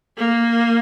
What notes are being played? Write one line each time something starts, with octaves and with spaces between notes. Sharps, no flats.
A#3